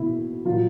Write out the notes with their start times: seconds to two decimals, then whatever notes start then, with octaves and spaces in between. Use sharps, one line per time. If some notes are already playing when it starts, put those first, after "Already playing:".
Already playing: B2 E4
0.45 A#2 F#3 F4